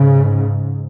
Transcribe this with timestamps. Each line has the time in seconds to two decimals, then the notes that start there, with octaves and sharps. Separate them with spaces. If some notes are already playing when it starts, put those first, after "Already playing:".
Already playing: G#2 C#3